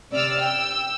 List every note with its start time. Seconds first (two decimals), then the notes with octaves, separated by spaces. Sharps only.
0.12 C3 D5 E6 F6
0.41 G5 E6